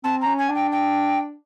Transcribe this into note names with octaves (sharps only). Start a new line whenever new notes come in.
C4 A5
C#4 A#5
G#5
D4
G5
G5